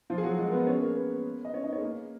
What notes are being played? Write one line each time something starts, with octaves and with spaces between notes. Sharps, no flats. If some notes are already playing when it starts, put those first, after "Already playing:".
F3 F4
G#4
F#3 F#4
G#3 G#4
A#4
B3 B4
C#4 C#5
G#4
A#3 A#4
B3 B4
D#5
C#4 C#5
D#4 D#5
C#4 C#5
G#4
A#3 A#4